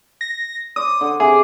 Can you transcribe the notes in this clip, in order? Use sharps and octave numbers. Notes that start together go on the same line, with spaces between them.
A#6
C5 D5 D#6
D3
C3 G#4 D6